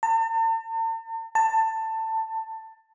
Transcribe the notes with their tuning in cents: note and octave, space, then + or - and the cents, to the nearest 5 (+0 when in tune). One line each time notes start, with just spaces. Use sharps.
A5 +45
A5 +20